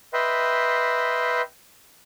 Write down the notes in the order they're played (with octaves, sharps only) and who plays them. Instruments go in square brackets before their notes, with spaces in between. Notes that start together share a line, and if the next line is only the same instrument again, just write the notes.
[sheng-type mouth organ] B4 D#5 E5 G5 C6